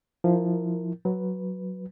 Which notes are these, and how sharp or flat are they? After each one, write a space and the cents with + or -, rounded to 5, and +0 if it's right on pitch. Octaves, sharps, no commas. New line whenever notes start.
F3 +0 E4 -20 A#4 +0
F#3 +0 B4 +0